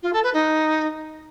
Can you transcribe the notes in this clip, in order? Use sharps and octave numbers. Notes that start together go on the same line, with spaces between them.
F4
A4
B4
D#4